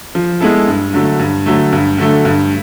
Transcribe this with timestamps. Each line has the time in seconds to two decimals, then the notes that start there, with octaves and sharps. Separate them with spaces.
0.15 F3
0.41 G#3 B3 E4 A4
0.67 G2
0.94 D3 F#3 A3
1.19 G2
1.46 D3 F#3 A3
1.72 G2
1.98 D3 F#3 A3
2.25 G2